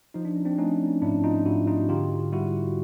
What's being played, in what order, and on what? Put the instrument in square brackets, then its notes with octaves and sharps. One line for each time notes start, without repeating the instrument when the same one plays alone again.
[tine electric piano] F3 D#4
D4
C#4
C4 D4
A3 C#4 D#4
G#2 D4 E4
D#4 F4
G#2 E4 F#4
D#4 F4
D3 F4 G4
G3 E4 F#4